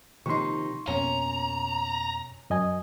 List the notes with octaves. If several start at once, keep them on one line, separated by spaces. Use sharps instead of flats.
C3 D#3 F3 A#3 D#4 C6 C#6
F2 B2 A#3 C#4 A#5
F#2 D#5 G#5